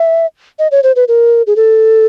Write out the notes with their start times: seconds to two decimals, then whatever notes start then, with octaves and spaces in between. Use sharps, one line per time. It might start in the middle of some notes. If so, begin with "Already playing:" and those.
Already playing: E5
0.59 D#5
0.72 C#5
0.83 C5
0.96 B4
1.08 A#4
1.47 G#4
1.56 A4